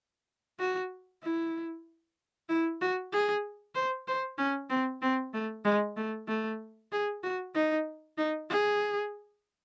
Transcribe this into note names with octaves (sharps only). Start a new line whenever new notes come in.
F#4
E4
E4
F#4
G#4
C5
C5
C#4
C4
C4
A3
G#3
A3
A3
G#4
F#4
D#4
D#4
G#4